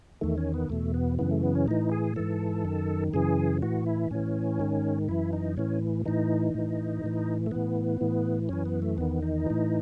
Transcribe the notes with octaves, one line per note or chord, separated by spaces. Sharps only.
E2 D#3 A3
C#4
B3
E2 B2 A3
B3
F#2 C#3 E3 B3
A3
B3
C#4
A2 E3 D#4
G#4
G#2 E3 A4
F#2 D#3
F#2 C#3 E3 G#4
A2 E3 F#4
E4
A2 E3 C#4
G#2 D#3
F#2 E3 E4
D#4
A2 E3 C#4
A2 E3 D#4
A2 E3
A2 E3
A3
A2 E3 B3
A2 E3
F#2 E3 C#4
B3
A3
E2 D#3 B3
D#4
A2 E3